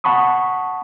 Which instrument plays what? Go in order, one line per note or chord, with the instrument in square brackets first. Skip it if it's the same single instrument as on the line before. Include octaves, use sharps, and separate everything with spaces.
[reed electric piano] F#5 A5 B5 C#6 D#6